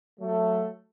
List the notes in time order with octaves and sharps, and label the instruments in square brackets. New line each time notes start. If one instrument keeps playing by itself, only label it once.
[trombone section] F#3 A3